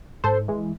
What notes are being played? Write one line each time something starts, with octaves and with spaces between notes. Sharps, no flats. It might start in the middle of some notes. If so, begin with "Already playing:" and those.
G#2 A4 C5
E3 G#3